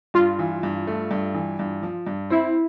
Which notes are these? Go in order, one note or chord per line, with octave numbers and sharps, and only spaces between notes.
G2 F4
E3
G2
A3
G2
E3
G2
F3
G2
C4 E4